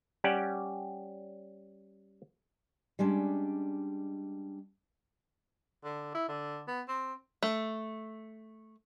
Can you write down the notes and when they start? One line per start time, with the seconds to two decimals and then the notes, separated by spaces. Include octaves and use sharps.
0.24 G3 C#4 G4 D5 F#5
2.99 G3 G#3 C#4 D4
5.84 D3
6.15 E4
6.28 D3
6.68 B3
6.88 C4
7.43 A3